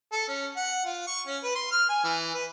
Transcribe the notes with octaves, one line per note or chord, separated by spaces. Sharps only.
A4
C#4
F#5
F4
C#6
C#4
B4
C6
F6
G#5
E3
B4